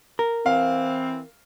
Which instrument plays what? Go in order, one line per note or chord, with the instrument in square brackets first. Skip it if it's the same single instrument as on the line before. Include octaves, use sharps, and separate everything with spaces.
[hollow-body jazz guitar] A#4
[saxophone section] E3 C4 [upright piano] F5